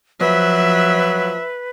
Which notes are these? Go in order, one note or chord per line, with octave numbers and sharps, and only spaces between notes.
F3 F#3 B4 E5